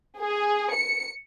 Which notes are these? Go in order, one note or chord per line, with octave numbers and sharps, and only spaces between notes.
G#4
C#7